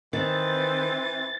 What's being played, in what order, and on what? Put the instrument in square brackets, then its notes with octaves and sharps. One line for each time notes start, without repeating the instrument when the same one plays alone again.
[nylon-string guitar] D#3 [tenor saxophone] E3 [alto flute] C4 [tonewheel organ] A6